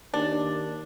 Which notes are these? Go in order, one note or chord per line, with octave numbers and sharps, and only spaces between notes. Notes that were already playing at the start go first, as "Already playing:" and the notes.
D#2 D4